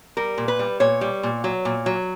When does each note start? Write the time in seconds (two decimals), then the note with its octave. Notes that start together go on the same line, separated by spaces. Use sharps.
0.17 G3 A#4
0.38 A#2
0.48 B4
0.59 G3
0.80 A#2 C#5
1.01 G3
1.23 A#2
1.44 F#3
1.65 A#2
1.86 F#3